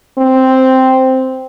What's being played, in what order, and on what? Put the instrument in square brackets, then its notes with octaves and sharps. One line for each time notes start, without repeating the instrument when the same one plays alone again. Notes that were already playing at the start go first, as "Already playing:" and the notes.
[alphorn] C4